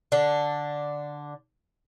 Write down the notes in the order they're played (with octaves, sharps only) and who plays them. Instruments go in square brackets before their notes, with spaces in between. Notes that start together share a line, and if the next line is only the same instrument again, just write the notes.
[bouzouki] D3 D4